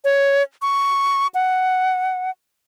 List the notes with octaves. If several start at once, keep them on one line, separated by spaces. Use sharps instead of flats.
C#5
C#6
F#5